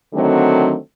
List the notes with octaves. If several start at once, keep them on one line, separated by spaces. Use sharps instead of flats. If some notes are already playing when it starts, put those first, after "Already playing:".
D3 D#3 F#3 A3 C4